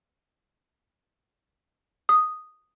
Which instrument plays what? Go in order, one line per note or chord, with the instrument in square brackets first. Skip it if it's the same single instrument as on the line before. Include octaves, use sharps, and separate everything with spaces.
[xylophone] D#6